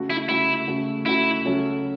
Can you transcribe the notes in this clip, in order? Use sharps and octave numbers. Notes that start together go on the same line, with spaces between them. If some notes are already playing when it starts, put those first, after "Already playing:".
Already playing: C#3 A3 F#4
E4
C#3 A3 E4 F#4
C#3 A3 F#4
C#3 A3 E4 F#4
C#3 F#3 C#4 A4 C#5